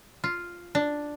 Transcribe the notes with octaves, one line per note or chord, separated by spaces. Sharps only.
F4
D4